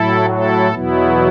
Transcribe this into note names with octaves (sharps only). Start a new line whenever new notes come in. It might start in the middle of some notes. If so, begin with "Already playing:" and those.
Already playing: A2 F#3 E4 A4
E4 A4
E2 B2 F#3 B3 E4